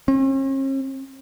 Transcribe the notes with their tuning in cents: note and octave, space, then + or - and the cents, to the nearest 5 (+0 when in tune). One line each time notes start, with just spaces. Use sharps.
C#4 -45